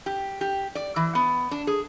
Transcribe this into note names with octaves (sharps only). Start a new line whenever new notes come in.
G4
G4
D5
E3
B3
D4
G#4